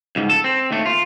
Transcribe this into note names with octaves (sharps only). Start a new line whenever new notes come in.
C#2 G#2
A4
C4
D#2 A3
F4